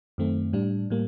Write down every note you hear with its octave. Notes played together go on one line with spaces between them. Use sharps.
F#2 D#3 A3 C4
A2 G3 D4
A2 G3 A#3